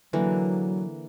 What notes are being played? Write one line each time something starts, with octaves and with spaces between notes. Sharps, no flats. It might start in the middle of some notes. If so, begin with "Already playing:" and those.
D3 E3 F#3 A#3